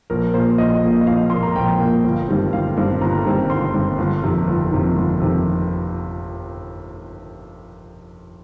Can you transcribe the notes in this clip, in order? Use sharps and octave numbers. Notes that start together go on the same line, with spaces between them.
A#1 A#4
A#2 A#3 C5
A#1 D#5
A#2 A#3
D#5
A#1 F5
A#2 A#3 C6
A#5
A#1 G5
A#2 A#3
G1
G2 D#3 G3 C4
G1 F5
G2 D#3 G3 C4
G1 A#5
G2 D#3 G3 C4
G1 C6
G2 D#3 G3 C4
G1
F2 C3 D#3
G1
F2 C3 D#3
G1
F2 C3 D#3